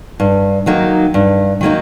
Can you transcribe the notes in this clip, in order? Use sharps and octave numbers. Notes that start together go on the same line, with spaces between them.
G2
D#3 F#3 A#3 D#4
G2
D#3 F#3 A#3 D#4